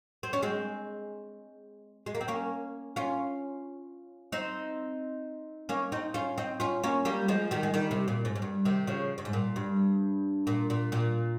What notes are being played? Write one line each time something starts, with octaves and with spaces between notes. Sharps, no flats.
C4
C#4
G#3 C4
G#3
A#3
C4
A#3 C#4
C#4 F4
C4 D#4
A#3 C#4
C4 D#4
C#4 F4
C4 D#4
C#4 F4
A#3 C#4
G3 A#3
F3 G#3
D#3 G3
G#3
D#3 G3
C3
A#2
G#2
G#2
G2
C3 D#3
C#3 F3
G2
G#2
A#2
G2
A#2
A#2
A#2